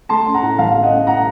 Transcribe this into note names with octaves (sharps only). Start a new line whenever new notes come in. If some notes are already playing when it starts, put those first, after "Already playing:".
A3 A5 C6
C#4
F#5 A#5
A2
A1 F5 A5
A3
D#5 F#5
C#4
A2 F#5 A#5